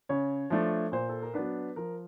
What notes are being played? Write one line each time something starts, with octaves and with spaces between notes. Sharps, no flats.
C#3 C#5
F3 A3 D4
A#2 C5
A4
A#4
F#3 B3 D4 B4
F3 A#4